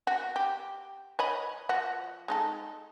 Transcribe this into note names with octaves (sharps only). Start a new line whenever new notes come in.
F#4
G4
C#5 D#5 B5
F3 F#4
G#3 D#4 A4